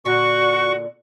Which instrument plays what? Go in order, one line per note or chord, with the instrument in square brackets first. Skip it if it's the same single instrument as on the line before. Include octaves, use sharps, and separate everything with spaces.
[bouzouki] A#2 D3 [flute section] F#4 [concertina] C#6